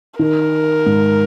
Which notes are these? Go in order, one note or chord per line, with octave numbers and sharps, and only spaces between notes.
D#3 A#4
G#2